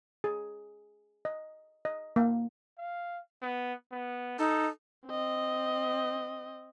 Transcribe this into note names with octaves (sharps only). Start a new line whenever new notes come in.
G#4
D#5
D#5
A#3
F5
B3
B3
D#4 A4
C4 D#5